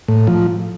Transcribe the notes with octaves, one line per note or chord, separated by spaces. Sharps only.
A2
F3